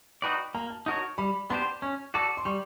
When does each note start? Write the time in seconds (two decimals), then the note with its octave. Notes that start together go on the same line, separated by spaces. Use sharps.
0.22 D#4 F#4 B4 D5 G5
0.55 A#3 A#5
0.70 A5
0.86 D#4 F#4 A#4 C#5 A5
1.18 G3 B5
1.50 B3 D4 G4 C5 C6
1.82 C#4 C#6
2.14 F#4 A4 D5 D6
2.37 C6
2.45 G3 C#6